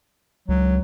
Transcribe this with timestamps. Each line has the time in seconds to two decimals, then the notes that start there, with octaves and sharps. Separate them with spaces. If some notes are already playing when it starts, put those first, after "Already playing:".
0.48 C#2 F#3